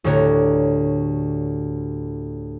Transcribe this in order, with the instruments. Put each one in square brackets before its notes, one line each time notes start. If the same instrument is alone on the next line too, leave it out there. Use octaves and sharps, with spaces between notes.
[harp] D2 A2 D3 G4 C#5 A#5